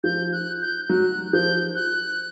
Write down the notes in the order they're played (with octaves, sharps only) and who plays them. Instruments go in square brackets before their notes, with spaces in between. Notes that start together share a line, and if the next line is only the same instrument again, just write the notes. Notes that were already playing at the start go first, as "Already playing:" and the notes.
[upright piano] F3 [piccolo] G6
[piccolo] F#6
G6
[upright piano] F#3 [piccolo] F#6
[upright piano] F3 [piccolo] G6
[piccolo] F#6